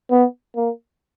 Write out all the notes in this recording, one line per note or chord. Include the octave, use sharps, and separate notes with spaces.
B3
A#3